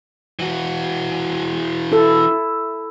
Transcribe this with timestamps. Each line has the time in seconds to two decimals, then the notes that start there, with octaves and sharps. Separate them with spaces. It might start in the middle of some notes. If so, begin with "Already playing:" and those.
0.39 E3 F#4
1.92 E4 A4